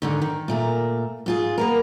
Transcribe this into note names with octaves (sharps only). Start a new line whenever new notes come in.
G#2 D3 D#3
D#3
A#2 A3 A#4
G#2 F4 G#4
A#3 B3 A#4